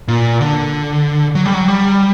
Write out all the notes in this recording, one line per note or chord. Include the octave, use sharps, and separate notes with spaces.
A#2
D3
F#3
G3
F#3
G3